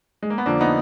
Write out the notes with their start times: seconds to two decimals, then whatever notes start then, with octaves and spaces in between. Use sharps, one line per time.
0.23 G#3
0.30 A#3
0.38 B3
0.46 F2 D3 F3 A#3 D4
0.61 B3 D#4